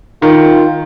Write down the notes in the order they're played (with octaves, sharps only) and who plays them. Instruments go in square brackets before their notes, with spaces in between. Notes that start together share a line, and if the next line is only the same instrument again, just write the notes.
[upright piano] D#3 [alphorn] F4